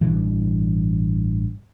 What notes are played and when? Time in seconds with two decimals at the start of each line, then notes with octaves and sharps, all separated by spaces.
0.01 A1 G2 B2 E3